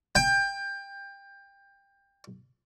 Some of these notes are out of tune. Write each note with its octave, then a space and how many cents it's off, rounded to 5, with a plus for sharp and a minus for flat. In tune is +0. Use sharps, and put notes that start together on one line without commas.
G5 +20